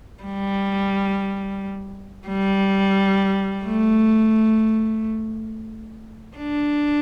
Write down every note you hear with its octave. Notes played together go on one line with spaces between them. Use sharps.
G3
G3
A3
D4